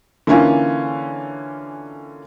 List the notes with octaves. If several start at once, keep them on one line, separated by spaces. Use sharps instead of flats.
D3 E3 A#3 C#4 F4